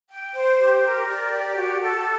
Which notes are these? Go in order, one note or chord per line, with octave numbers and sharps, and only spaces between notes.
G5
C5
G4
A#4
D5
G4
F#4
A4